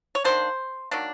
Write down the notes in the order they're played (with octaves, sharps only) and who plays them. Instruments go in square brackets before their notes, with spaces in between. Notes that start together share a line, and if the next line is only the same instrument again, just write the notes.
[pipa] C#5
D#3 F#3 A#3 D4 C5
D#3 F#3 A#3 D4